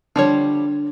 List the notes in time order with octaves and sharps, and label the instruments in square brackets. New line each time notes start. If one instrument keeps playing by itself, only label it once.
[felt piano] D3 [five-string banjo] F3 G3 C#5